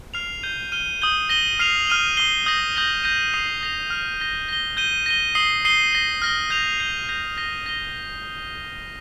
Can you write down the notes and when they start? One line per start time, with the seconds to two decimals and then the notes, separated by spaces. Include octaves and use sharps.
0.14 F6 C7 F7
0.43 G6 D#7 G7
0.72 F6 D#7 G7
1.02 D#6 G6 D#7 G7
1.29 A#6 D#7 G7
1.59 F6 C7 F7
1.87 F6 D#7 G7
2.17 D#6 C7 G7
2.46 D#6 G6 A#6
2.75 D#6 G6 A#6 D#7 G7
3.04 G6 A#6 D#7
3.33 D#6 C7 F7
3.61 D#6 A#6 F7
3.90 F6 C7 F7
4.20 A#6 G7
4.48 A#6 G7
4.77 G6 D#7 G7
5.06 A#6 D#7 G7
5.35 D#6 C7 G7
5.65 D#6 C7 D#7 G7
5.93 A#6 G7
6.22 F6 A#6 G7
6.50 G6 A#6 F7
6.80 G6 C7 G7
7.09 G6 A#6 F7
7.38 A#6 D#7 G7
7.66 A#6 G7